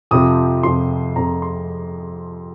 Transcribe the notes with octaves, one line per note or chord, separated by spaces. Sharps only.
F2 C3 F3 D#6
F2 C3 F3 C6
F2 C3 F3 A#5
C6